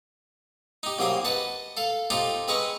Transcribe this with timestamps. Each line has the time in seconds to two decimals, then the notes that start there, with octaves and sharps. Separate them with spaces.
0.83 D#4 G4
0.98 C2 F#3 A#3 G#4 C6
1.25 B4 D#5 F#5 A5
1.77 A4 F5
2.10 D#4 F4 G4 A4 C5
2.48 G#3 C4 B4 D#5 A#5 C#6